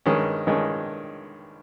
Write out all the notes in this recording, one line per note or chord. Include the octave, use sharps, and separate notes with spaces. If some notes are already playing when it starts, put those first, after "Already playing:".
G2 D#3 G#3 C#4
G2 D#3 G#3 C#4